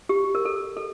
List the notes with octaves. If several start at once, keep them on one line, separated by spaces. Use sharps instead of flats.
G4
A#4
A4
A4